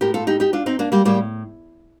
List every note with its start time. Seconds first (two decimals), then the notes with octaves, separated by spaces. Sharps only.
0.01 A2 G4 A#4
0.14 F4 A4
0.27 D#4 G4
0.40 D#4 G4
0.53 D4 F4
0.66 C4 D#4
0.79 A#3 D4
0.92 G3 A#3
1.05 A2 G3 A#3